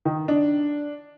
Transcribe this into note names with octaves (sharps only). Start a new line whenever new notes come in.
D#3
D4